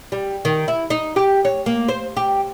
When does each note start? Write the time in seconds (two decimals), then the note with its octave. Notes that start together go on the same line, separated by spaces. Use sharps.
0.12 G3
0.45 D#3
0.68 E4
0.90 D#4
1.16 G4
1.45 C#5
1.66 A#3
1.89 C5
2.17 G4